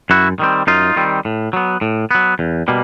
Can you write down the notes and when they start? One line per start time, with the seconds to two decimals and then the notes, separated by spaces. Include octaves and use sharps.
0.10 F#2 E4 F#4
0.39 D#3 G3 C4
0.67 F#2 D#4 F4
0.96 D#3 G3 C4
1.25 A2
1.53 F#3 B3
1.81 A2
2.11 F#3 B3
2.39 E2
2.68 B2 G3 A#3